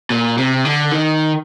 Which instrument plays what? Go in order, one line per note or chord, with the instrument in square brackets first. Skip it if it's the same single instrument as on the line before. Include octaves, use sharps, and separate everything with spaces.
[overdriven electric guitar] A#2
C3
D3
D#3